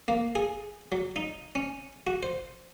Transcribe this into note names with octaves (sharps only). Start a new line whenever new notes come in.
A#3
G#4
F#3
D#4
C#4
F#4
C5